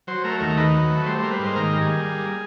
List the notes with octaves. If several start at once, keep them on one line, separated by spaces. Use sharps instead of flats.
F#3 C5
A3 A#4
D#2 A#4
D#3 B4
F#3
A3
G3 C5
A#3 C5
B4
G#2 C5
D#3 A#4
G3
G#4
A#3
G3